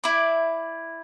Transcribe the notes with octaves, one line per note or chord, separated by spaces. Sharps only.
E4 D5